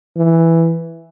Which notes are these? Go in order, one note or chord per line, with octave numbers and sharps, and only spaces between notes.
E3